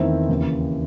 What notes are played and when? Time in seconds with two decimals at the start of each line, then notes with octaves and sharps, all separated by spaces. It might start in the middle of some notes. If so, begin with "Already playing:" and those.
Already playing: E2 D#3 A3 C4 E4
0.29 D#2 C#3 E3